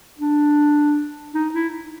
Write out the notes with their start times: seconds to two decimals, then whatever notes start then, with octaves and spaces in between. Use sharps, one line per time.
0.18 D4
1.34 D#4
1.54 E4